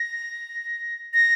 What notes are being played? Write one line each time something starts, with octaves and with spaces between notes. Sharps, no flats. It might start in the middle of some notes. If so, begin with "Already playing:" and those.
Already playing: A#6
A#6